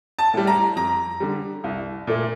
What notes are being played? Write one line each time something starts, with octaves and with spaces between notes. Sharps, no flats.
A5
A2 G3
A#5
F2 A#5
D3 G3
C2
A#2 A3